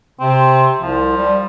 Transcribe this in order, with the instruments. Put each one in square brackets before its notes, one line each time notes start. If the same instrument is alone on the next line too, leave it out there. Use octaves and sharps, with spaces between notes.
[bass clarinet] C3 [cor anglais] C4
[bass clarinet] C2 [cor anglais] F3
[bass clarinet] G3